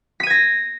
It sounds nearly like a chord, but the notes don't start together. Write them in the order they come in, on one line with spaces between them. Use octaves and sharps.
B6 D#7 G#6 A#6